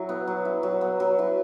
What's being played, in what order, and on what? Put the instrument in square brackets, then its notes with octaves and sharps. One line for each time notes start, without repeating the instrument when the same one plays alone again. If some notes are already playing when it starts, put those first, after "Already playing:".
Already playing: [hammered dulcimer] F#3 E4
B3
F#3
E4
F#3
B3
F#3
E4